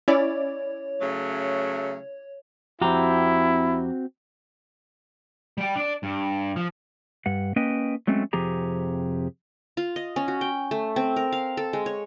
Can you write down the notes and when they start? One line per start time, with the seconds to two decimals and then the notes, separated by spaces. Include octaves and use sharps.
0.08 C#4 E4 C#5 D5
1.00 C#3 F#3 A3
2.81 F2 C4 E4 F#4 G4 A#5
5.58 G3 G5
5.76 D4 D5
6.03 G2
6.56 F3
7.26 G2 F#5
7.56 A#3 C#4 B4 D#5 G5
8.07 F#3 G#3 A3 C4 C#4
8.33 F2 C3 F3 G4 G#4 A#5
9.77 F4
9.96 D#5
10.16 C#4
10.28 F#4
10.41 G5
10.71 A3
10.96 C4
11.16 A#4
11.32 F5
11.57 A4
11.73 G#3
11.86 C#5